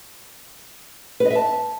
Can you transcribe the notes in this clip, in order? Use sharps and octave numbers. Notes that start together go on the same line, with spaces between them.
B4
D#5
E5
A5